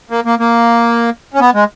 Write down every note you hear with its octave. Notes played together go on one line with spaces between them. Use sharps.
A#3
A#3
A#3
C#4
B3
G#3